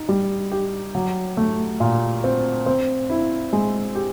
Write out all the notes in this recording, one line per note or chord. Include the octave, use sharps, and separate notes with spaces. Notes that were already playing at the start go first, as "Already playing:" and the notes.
Already playing: D#4
G3
G4
F#3
A3
A#2
C4
C4
E4
G#3
G4